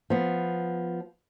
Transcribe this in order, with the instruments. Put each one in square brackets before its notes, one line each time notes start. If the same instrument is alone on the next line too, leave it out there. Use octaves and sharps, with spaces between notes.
[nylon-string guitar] F3 B3